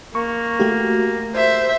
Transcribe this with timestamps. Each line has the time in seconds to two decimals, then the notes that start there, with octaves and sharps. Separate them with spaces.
0.15 A#3 C#6
0.60 A3 F#4 G4
1.35 C5 E5